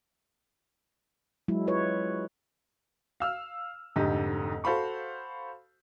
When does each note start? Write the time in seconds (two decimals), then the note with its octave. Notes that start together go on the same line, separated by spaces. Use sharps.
1.48 F#3 G#3 E4
1.67 E4 F4 B4 C#5
3.20 F5 E6 F6
3.96 F1 G#2 D3 G4 D#5
4.64 F#4 A4 C5 F5 B5 C#6